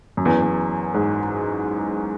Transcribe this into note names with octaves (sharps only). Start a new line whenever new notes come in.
F#2
E2
E2
G#2